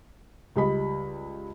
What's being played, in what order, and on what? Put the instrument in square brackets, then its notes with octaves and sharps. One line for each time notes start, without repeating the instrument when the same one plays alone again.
[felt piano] C#2 G3 D#5 B5